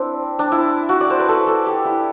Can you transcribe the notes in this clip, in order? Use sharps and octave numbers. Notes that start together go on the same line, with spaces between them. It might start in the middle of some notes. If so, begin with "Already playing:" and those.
Already playing: C4 D4 E4
D4
E4
F#4
D5
C5
B4
A4
A4
G4
E4